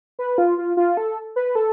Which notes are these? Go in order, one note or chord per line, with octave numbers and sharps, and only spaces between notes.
B4
F4
F4
F4
A4
B4
A4